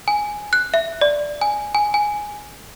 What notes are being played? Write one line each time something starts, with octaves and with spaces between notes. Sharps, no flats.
G#5
F#6
E5
D5
G#5
G#5
G#5